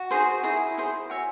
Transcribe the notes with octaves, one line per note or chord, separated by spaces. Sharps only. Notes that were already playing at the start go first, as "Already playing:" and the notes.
Already playing: F#4
D#4 G#4 C5
D#4 E4 G#4 C5
D#4 G#4 C5
F#4 C#5 E5 G#5